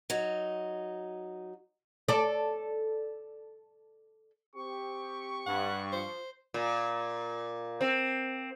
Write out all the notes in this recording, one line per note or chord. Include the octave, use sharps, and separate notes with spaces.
F#3 D#4
A4 D5
C4 G4 C#6
G2 F#5
F3 C5
A#2
C4